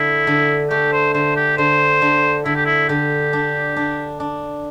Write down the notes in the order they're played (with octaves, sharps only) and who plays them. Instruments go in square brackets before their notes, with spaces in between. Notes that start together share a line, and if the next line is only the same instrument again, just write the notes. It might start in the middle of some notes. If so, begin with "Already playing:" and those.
Already playing: [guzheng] D3 [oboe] E4
[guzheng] D3
[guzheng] A3 [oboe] G4
[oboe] C5
[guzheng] D3 [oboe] C5
[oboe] G4
[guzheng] D3 [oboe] C5
[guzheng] D3
[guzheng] D3 [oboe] E4
[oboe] G4
E4
[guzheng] D3 [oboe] G4
[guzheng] D4
D4
D4